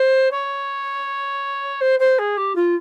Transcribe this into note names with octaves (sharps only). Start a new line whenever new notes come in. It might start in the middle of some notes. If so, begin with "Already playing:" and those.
Already playing: C5
C#5
C5
C5
G#4
G4
F4